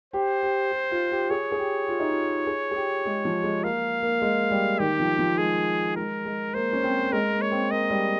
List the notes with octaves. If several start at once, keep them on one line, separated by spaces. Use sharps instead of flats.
G4 C5
G4
G4
F4
G4
G#4 C#5
G#4
G4
F4
D#4
F4
G#4
G#4
G4
G#3
F3
G#3
A#3 F5
A#3
G#3
G3
D#3 G4
F3
F3
G#3 G#4
G#3 A#4
G#3
A#3 C5
C#4
C4
G#3 A#4
A#3
C#5
C4
A#3 D#5
G3